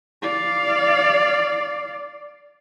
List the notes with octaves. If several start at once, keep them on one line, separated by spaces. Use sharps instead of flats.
D5 F5